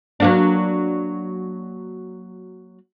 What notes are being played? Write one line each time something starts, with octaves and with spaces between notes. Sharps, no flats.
F#3 A#3 D4